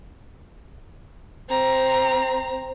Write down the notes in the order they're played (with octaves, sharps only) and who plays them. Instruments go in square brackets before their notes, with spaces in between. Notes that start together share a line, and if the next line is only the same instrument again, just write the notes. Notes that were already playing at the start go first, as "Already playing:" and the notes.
[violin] C4 A#5